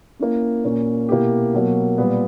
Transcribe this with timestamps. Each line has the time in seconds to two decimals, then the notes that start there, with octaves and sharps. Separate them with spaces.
0.19 A#3 C#4 E4
0.64 A#2 A#3 C#4
1.09 B2 A#3 E4 G4
1.54 B2 F#3 A#3
1.98 A#2 G3 B3